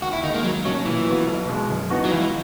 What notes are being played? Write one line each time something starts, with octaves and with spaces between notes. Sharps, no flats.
D#2 F#4
E4
D#3 G#3 D#4
A#3
C#2 F#3
B2 F#3 A#3 C#4
A#2 E3
F#3 B3 F#4
B1
B2 G#3
F#2
E3 B3 D#4 F#4
F#3
C#2 E3